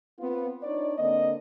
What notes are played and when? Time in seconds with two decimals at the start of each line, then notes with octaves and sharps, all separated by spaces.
0.19 B3 C4 F4
0.63 D4 D#4 C#5 D5
0.97 D3 A#3 C4 D#5